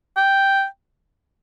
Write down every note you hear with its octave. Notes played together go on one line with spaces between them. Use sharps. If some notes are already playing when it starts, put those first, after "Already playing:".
G5